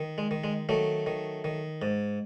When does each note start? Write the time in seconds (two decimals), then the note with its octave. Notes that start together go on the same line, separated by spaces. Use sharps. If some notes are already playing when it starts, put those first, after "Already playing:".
Already playing: D#3
0.18 G#3
0.31 D#3
0.44 G#3
0.69 D#3 F#3 A3
1.06 D#3
1.44 D#3
1.82 G#2